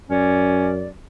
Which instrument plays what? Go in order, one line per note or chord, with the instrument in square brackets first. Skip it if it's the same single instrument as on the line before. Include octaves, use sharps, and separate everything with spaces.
[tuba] F#2 [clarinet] C#4 [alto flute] D5